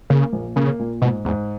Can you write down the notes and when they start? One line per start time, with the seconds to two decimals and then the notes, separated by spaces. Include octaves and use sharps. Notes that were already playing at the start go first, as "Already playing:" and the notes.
0.10 C#3 A#3
0.33 A#1
0.56 C#3 A#3
0.79 A#2
1.02 G#2 B2
1.25 E2 G#2